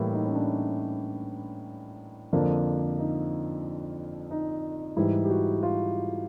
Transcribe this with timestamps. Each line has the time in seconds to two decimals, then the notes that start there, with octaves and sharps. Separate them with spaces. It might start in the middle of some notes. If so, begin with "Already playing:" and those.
Already playing: A2 E3 G3 A#3 E4
0.13 D#4
0.25 C#4
0.35 D4
2.33 F2 D3 F3 A#3 D4
2.99 D#4
4.31 D#4
4.97 G#2 E3 G3 E4
5.24 G4
5.30 F#4
5.63 F4